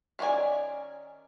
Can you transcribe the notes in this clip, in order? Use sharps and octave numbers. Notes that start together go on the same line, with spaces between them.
D#3 C#4 F4 D5 G#5